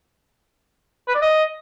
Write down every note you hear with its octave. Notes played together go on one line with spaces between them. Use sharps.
B4
D5
D#5